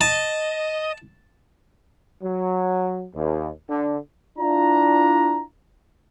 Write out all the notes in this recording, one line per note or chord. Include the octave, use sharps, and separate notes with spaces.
D#5 A5
F#3
D#2
D3
D4 E4 F4 A#5